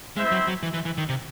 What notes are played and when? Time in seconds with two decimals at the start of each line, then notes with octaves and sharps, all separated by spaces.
0.17 G#3 C4 E4 C5 E5
0.31 F#3
0.48 F#3
0.63 E3
0.74 E3
0.85 E3
0.98 D#3
1.09 C3